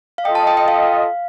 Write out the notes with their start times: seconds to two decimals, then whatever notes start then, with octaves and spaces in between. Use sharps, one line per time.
0.18 F5
0.25 F4 A4 D#5 G5
0.35 A5
0.47 G5
0.57 G5
0.68 F5